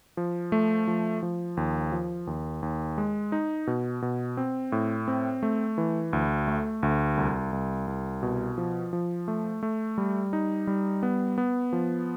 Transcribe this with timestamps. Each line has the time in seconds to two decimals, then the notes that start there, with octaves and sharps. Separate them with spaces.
0.17 F3
0.52 A3
0.87 F3
1.22 F3
1.57 D#2
1.92 F3
2.27 D#2
2.63 D#2
2.98 G#3
3.32 D#4
3.67 B2
4.02 B2
4.37 C4
4.72 A2
5.08 C4
5.43 A3
5.78 E3
6.13 D2
6.48 A3
6.83 D2
7.17 C2
7.53 C2
7.88 C2
8.23 B2
8.58 F3
8.93 F3
9.28 A3
9.63 A3
9.98 G3
10.33 D#4
10.67 G3
11.03 B3
11.38 B3
11.73 F3